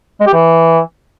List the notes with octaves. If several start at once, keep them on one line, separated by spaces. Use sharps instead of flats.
G#3
G4
E3